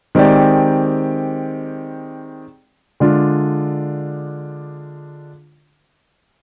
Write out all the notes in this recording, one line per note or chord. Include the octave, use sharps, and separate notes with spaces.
D#3 G#3 C4 G4 D5
D3 G#3 D4 F4